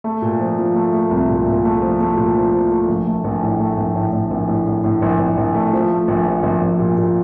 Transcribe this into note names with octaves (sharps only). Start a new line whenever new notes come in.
A3
A#2
F3
F3
A3
A3
C2
A#2
A#2
A3
F3
A3
A#2
F3
F3
A3
A#1
A3
A#1
A2
A3
A#1
A2
A2
A#1
A2
A2
A2
A#1
A#1
A#1
A3
F3
A3
A#1
F3
A#1
A#1
A#2
A#2